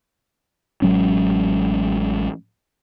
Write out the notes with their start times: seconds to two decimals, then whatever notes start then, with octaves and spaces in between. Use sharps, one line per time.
0.82 A1 F#3 G#3 C#4